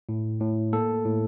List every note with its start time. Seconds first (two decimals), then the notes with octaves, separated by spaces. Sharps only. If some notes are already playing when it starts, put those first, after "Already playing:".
0.09 A2
0.41 A2
0.73 A#3 A4
1.05 A2